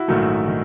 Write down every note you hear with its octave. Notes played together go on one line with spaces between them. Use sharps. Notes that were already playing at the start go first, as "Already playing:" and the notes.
Already playing: E4 F#4
A#1 G#2 D#3 F#3 A3
D#3